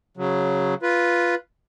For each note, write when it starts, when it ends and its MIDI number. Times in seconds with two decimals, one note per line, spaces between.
0.17 0.74 49
0.17 0.74 54
0.82 1.35 65
0.82 1.35 71